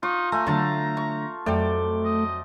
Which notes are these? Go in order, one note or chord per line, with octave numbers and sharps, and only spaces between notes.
D#4 F4 C#6
A3 G#5 A#5
D3 F#3 A3 F5 A5 C#6
C#6
F2 F#3 A3 D5 G5
D#5